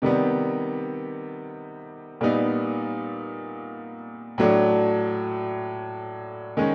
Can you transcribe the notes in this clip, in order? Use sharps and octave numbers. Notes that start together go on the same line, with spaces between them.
C3 D#3 G3 B3
A#2 G3 B3 D#4
A2 F#3 A3 D4
D#3 G#3 C#4